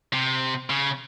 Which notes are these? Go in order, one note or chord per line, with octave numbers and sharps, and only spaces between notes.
C3
C#3